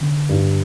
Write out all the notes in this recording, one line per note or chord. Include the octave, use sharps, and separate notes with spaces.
D3
G2